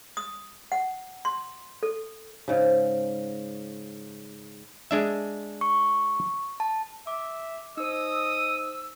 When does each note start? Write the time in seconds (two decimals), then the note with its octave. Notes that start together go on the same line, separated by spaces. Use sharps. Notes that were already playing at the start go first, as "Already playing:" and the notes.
0.17 D#6
0.72 F#5
1.25 C6
1.83 A4
2.48 G#2 C#3
4.91 G#3 D4 E5
5.61 C#6
6.60 A5
7.07 E5 D6
7.77 D#4 C5 D#5 D#6 E6